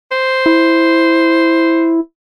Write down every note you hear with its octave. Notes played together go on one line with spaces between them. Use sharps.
C5
E4